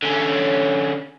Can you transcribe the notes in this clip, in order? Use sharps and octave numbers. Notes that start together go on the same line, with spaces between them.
D3 C#4